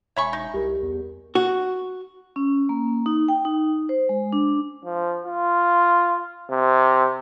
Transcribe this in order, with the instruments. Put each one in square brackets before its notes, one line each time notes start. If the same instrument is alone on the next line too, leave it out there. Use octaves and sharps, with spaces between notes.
[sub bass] E1 [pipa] C#5 B5 C#6 [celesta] E5 G#5
[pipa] D#4
[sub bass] C2 [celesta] G4 A#4
[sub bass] E2
[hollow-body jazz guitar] F#4
[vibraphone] C#4
A#3
D#4
G5
D#4
C5
G#3
D4
[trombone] F3
F4
C3